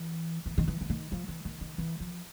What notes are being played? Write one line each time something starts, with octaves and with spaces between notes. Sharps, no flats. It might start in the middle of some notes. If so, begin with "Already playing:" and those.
Already playing: E3
E3
D#3
E3
E3
D#3
F3
E3
D#3
D#3
E3
F3